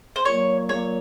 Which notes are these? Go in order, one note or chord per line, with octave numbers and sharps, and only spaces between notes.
C5
A#2 F#3 A#3 C#5
A#2 F#3 A#3 C#5